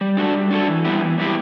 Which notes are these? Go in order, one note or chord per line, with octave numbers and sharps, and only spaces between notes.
G3
D4 F#4 A4
G3
D4 F#4 A4
E3
G3 B3 E4 G4
E3
G3 B3 E4 G4